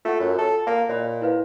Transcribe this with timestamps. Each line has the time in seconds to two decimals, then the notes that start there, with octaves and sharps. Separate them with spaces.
0.05 A3 F4 E5 F#5
0.20 F#2
0.38 A4
0.67 A#3
0.89 A#2 C#5 D#5 B5
1.22 E4 B4 F5